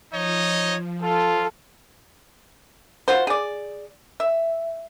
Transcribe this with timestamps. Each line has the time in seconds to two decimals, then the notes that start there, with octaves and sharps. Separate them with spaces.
0.12 F3 D#4 C#5 D#5
1.02 F4 A4
3.08 F4 F#4 C5
3.27 G#4 D5
4.20 E5